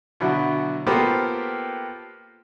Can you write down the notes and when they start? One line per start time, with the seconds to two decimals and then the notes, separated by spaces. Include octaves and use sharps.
0.20 B2 D3 F#3 E4
0.87 A#3 B3 F4 G4 A4 C5